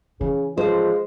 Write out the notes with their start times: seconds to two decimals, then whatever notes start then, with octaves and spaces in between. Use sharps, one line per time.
0.21 C#3 E3
0.58 F3 G#3 C5